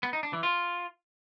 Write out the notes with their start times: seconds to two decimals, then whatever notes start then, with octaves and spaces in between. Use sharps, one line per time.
0.03 B3
0.13 D#4
0.23 D4
0.33 E3
0.43 F4